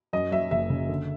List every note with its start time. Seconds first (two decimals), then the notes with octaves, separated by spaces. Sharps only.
0.13 F#2 D#5
0.32 F#3 E5
0.51 F#1 E5
0.70 C#3
0.89 D3